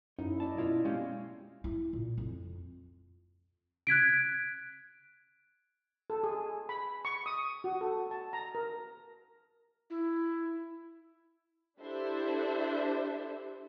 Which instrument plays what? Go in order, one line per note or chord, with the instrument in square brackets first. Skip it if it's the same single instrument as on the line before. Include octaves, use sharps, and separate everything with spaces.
[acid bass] F#2 [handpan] C#4 E4 [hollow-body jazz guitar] D#4
[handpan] A#3 D5 D#5 [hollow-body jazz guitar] A5
[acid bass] B2 [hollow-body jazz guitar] E4 F4
[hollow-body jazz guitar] G#3 C#4 G4 [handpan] F5
[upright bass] E4
A#2
F2
[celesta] F#6 G#6 B6 D7
[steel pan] A4
G#4
B5
C#6
D#6
F#4
A4
A5
A#5
A#4
[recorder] E4
[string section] D4 E4 G4 A4 C5 E5